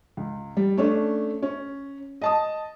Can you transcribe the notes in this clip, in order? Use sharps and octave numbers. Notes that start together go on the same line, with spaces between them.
C#2
G3
A3 C#4 D4
C#4
D#5 A5 D#6